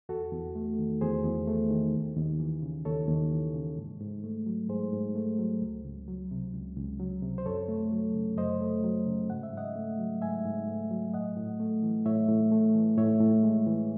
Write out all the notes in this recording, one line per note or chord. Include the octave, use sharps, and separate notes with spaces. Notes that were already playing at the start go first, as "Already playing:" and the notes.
E2 F#4 A4
E2
A3
D#3
E2 G#4 C5
E2
A3
D#3
D#2
D#2
E3
C#3
D#2 A4 C#5
D#2
E3
C#3
G#2
G#2
A3
F#3
G#2 G#4 C5
G#2
A3
F#3
C#2
C#2
F#3
C3
C#2
C#2
F#3
C3
C5
F#2 A4 C#5
A3
F#3
C#3
F#2 C5 D#5
A3
F#3
C#3
G#2 F#5
E5
G#2 D#5 F#5
A3
F#3
G#2 E5 G#5
G#2
A3
F#3
A2 D#5 F#5
A2
A3
E3
A2 C#5 E5
A2
A3
E3
A2 C#5 E5
A2
G#3
E3